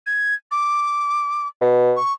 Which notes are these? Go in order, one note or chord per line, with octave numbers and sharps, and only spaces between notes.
G#6
D6
B2
C#6